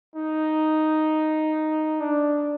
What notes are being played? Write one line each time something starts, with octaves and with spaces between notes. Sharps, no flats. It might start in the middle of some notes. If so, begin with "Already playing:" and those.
D#4
D4